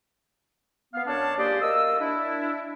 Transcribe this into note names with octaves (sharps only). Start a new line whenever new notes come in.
B3 F5
F#2 D4 C#5 D5 F5 A5
C#2 A#3 G4 G#4 C5 D5
A#3 A#4 D#5 E6
D4 E4